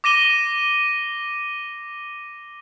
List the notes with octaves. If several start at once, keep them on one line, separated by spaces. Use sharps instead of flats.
D6 A#6 D#7 G7